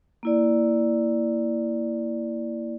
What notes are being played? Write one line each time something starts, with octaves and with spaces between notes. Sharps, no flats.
A#3 E4 D5